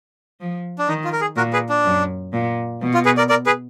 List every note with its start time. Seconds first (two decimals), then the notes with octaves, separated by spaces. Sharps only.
0.40 F3
0.79 D4
0.88 D#3 D#4
1.04 F4
1.13 A#4
1.21 G#4
1.37 A#2 F#4 A#4
1.53 G#4 B4
1.69 D4
1.85 F#2
2.33 A#2
2.81 B2
2.94 F4
3.05 G#4 B4
3.17 A#4 D5
3.29 A#4 D5
3.46 G#4 B4